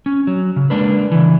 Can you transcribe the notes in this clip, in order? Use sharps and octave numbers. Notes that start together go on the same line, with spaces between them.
C#4
F#3
C#3
G#3 A#3 D4 B4
C#3 E3